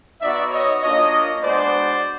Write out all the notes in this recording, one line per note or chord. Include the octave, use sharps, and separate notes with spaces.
B3 D#4 F#4 D5 E5
C#5 D#5
A#3 D4 F4 C#5 D#5
G#3 B3 D4 F#4 C5 D5